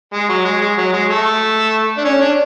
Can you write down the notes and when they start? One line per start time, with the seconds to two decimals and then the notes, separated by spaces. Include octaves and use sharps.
0.13 G#3
0.29 F#3
0.45 G#3
0.61 G#3
0.77 F#3
0.93 G#3
1.10 A3
1.98 D4
2.05 C#4
2.21 D4